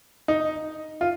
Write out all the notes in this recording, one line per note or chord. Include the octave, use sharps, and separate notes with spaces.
D#4
F4